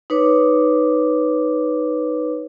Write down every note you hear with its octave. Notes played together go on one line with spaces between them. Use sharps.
D#4 B4 C#5 D6